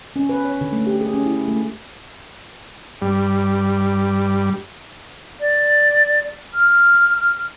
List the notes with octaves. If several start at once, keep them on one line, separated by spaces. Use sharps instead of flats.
C#4
B4
C#5
D3
A3
G4
G#4
C#4
E4
A3
G2 G3
D5
F6